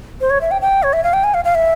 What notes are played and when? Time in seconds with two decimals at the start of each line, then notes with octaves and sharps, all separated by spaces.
0.21 C5
0.30 C#5
0.41 E5
0.51 G5
0.61 G5
0.83 C#5
0.93 E5
1.04 F5
1.13 G5
1.24 G#5
1.34 F5
1.45 F5
1.55 E5